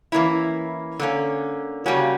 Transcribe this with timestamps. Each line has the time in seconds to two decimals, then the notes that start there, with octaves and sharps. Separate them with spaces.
0.12 E3 A#3 C#4 E4
1.00 D3 A#3 C#4
1.86 C#3 G3 A#3 C#4 F#4